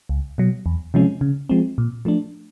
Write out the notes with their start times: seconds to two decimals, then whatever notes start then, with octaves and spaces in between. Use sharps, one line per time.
0.09 C#2
0.38 B2 F#3
0.66 E2
0.94 C3 F3 G#3 C#4
1.21 C#3
1.49 F3 G#3 C4
1.78 A#2
2.05 F3 A3 D4